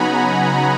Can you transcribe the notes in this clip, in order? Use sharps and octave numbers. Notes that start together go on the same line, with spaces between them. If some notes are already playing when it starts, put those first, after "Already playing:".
Already playing: C#3 F#3 B3 D#4 F#5 G#5 A#5 B5